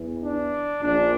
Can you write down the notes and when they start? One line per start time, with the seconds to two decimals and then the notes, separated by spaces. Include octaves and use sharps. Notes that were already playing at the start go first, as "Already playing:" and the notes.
Already playing: E2 E3
0.23 D4
0.82 A#1 A#2 D4